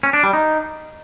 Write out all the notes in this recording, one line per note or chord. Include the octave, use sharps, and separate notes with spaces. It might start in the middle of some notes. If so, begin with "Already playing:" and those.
C#4
D4
G3
D#4